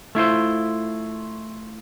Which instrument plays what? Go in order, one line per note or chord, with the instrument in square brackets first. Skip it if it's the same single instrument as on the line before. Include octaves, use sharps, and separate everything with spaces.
[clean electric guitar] A3 E4 F4 C5